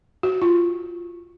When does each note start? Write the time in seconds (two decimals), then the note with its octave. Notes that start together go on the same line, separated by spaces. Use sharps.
0.23 F#4
0.42 F4